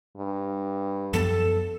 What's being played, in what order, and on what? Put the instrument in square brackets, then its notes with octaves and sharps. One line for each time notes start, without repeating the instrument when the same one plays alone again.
[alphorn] G2
[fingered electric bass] F#2 F3 B3 [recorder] A4